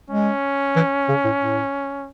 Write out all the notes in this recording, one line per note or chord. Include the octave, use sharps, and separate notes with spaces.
G#3 C#4
E3
C#3
A2
A2